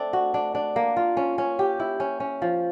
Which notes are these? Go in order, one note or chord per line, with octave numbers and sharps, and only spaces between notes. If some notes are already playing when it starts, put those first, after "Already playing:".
Already playing: A3 C4 D4
F#4
D4
D4
A#3
F4
C#4
C#4
G4
E4
C#4
C#4
F3